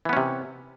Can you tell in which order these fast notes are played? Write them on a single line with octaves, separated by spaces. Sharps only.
E3 B3 C#4 C3